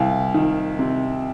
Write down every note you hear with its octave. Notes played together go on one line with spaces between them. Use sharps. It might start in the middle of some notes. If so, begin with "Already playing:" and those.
Already playing: C2 F5
D#3
C3